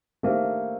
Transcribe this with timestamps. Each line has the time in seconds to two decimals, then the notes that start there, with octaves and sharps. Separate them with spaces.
0.23 D#3 A3 A#3 D4 G4 C5